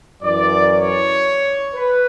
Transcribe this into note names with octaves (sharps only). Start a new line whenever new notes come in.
F#2 E3 D5
C#5
B4